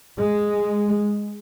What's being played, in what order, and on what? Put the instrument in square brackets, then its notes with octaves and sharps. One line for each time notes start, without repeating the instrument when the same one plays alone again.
[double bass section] G#3